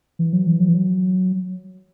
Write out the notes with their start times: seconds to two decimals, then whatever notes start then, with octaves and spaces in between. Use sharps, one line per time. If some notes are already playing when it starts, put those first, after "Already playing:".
0.19 E3
0.33 F#3
0.47 E3
0.60 F#3
0.69 E3
0.74 F#3